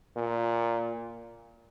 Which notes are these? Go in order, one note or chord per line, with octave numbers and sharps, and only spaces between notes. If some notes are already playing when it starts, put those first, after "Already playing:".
A#2